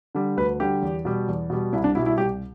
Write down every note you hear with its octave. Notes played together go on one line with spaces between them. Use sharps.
D3 G3
D2 B4
D3 G3 G4
E2
B2 G3
E2
B2 G3
C2 E4
D4
B2 G3 E4
E4
C2 G4